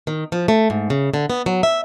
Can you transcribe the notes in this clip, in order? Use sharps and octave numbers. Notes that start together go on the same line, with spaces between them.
D#3
F3
A3
G#2
C#3
D3
B3
F#3
E5